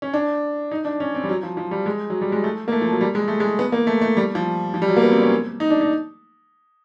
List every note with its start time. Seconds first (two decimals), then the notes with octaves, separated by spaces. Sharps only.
0.02 C#4
0.13 D4
0.71 D#4
0.85 D4
1.00 C#4
1.15 C4
1.24 G3
1.29 F#3
1.43 F3
1.57 F3
1.71 G3
1.86 G#3
2.10 F#3
2.21 G3
2.32 G#3
2.44 A3
2.68 A#3
2.72 A3
2.81 F3
2.92 F#3
3.01 G3
3.15 G#3
3.28 A3
3.40 G#3
3.59 B3
3.72 A#3
3.87 A3
4.01 A3
4.17 G3
4.35 F3
4.74 F3
4.82 G3
4.88 F#3
4.97 A#3
5.02 B3
5.12 C4
5.22 C#4
5.60 D#4
5.70 D4
5.81 D#4